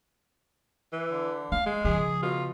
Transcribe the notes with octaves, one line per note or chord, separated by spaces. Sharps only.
E3
D3
A#3 F5
G#3
C#3 F3 G#4
B2 F4